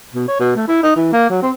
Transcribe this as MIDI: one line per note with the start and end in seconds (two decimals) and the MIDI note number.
0.15 0.26 47
0.28 0.36 73
0.40 0.54 47
0.56 0.65 57
0.68 0.82 64
0.83 0.96 63
0.96 1.08 52
1.13 1.29 58
1.30 1.39 54
1.42 1.51 60